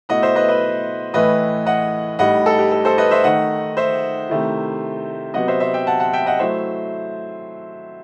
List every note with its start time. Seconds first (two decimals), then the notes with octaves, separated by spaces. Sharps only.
0.09 B2 A3 E4 D#5 F#5
0.22 C5 E5
0.35 B4 D#5
0.48 B4 D#5
1.14 A2 E3 A3 E4 B4 D#5
1.66 D#5 F#5
2.19 A2 G3 D#4 D#5 F#5
2.46 A4
2.59 G4
2.72 A4
2.85 A4 C5
2.98 B4 D#5
3.11 C5 E5
3.24 D#3 A3 D#4 D#5 F#5
3.77 C5 E5
4.29 C3 D#3 A3 E4
5.34 C3 F#3 B3 D#5 F#5
5.48 C5 E5
5.60 C5 E5
5.74 E5 G5
5.87 F#5 A5
6.00 F#5 A5
6.13 E5 G5
6.26 D#5 F#5
6.39 F#3 A3 E4 C5 E5